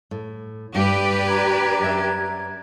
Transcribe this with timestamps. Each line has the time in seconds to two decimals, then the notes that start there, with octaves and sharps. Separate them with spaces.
0.11 A2
0.75 G2 G4 B4 D5
1.27 D4 A#5 G#6
1.80 F#2 E5